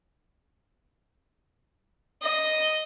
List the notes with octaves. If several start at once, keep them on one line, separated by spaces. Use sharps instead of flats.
D#5